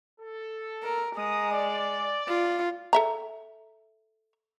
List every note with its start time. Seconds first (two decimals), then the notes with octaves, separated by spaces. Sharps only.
0.19 A4
0.83 A#4
1.16 G#3 A#5 D#6
1.52 D5
2.28 F4
2.93 A4 E5 A#5